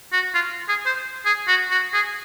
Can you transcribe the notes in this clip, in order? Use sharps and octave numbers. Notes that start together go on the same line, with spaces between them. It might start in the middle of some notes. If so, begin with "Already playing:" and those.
F#4
F4
G#4
C5
G#4
F#4
F#4
G#4